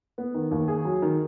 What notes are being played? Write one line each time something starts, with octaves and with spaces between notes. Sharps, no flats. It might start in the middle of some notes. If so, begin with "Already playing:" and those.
B3
D#3
D#2
G#4
F#3
D#3